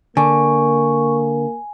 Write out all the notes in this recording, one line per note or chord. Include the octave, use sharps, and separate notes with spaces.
D3 A#3 G#5 C#6